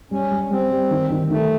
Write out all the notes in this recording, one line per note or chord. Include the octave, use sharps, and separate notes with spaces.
G3 C#4
G3
G3 C4
G3
D#3
D#3
D#3 A3